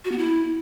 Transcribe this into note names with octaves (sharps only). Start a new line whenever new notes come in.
F#4
B3
E4